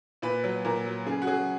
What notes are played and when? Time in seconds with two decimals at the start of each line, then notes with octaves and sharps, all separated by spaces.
0.22 A#2 B4
0.44 F#3
0.65 A#2 A#4
0.86 F#3
1.06 C#3 G#4
1.22 F#4
1.27 F#3 G#4